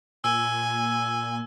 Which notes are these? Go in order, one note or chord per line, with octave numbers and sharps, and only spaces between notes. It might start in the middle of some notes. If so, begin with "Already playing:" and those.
A#2 G#5 E6